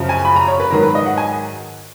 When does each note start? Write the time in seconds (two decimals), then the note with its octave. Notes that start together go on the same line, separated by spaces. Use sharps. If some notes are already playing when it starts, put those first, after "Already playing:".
Already playing: F#2 C#3 F3
0.09 G#5
0.25 B5
0.36 A#5
0.48 C#5
0.60 B4
0.70 G#2 D#3 F#3 A#4
0.83 B4
0.95 D#5
1.06 F#5
1.17 G#5